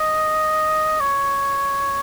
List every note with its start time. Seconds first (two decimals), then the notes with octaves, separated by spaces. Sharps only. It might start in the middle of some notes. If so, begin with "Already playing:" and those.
Already playing: D#5
1.00 C#5